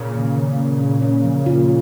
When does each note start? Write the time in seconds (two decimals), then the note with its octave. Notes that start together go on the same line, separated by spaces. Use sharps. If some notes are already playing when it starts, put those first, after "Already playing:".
Already playing: A#2 C#3
0.15 D#3
0.36 D#3
0.58 A#3
0.80 C#4
1.02 C#4
1.24 F3
1.46 F4